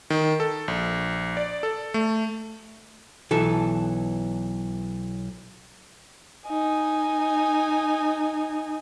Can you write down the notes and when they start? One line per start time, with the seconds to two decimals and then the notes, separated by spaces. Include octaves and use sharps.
0.10 D#3
0.40 A4
0.68 A#1
1.37 D5
1.63 A4
1.94 A3
3.31 B1 E3 A4
6.47 D#4 G#5